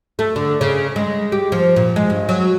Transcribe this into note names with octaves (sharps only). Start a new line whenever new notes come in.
A3
D3
C#3
G#3
G4
F3
A#2
G#3
G2
F#3